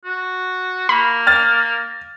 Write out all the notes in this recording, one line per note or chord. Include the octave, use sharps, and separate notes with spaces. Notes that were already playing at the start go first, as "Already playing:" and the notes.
F#4
A#3 B5
F6 A6